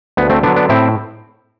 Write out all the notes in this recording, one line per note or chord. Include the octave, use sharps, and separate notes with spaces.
D2 B3
A3 C4
D3 F#3 B3 D4
B3 D4
A2 C4 E4